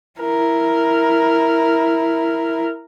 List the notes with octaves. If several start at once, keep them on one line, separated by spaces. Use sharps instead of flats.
E4 A#4